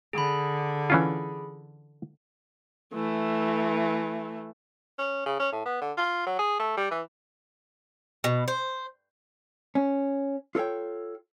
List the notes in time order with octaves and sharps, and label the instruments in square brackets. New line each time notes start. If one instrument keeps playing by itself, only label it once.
[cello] D3 [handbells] G#4 B5
[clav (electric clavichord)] E3 C#4 F4
[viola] E3 A3
[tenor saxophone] C#4
C#3
C#4
A2
B3
D3
F4
F#3
G#4
A3
G3
E3
[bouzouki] B2
C5
[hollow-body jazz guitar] C#4
F4 A4 A#4 C#5 G5